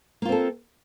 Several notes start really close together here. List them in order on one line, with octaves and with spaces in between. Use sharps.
A#3 F4 C4 A4